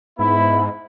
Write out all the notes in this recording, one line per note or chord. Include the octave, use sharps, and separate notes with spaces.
G#2 B3 E4 B5